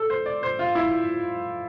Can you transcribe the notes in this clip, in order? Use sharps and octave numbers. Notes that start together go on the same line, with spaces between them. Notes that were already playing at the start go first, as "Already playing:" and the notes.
Already playing: A4
C5
D5
C5
F4
E4